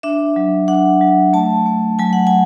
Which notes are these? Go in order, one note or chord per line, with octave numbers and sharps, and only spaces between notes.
D4 E5
F#3
D4 F#5
F#3
A3 A5
A3
F#3 G#5
F#5
G#5